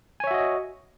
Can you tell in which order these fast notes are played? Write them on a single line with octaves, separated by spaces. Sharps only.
G#5 C#5 E5 F#4 D#5